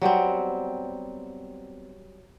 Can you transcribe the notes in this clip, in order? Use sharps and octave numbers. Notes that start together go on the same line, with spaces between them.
F#3 G3 B3 C4